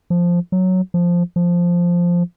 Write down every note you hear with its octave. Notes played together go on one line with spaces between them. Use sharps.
F3
F#3
F3
F3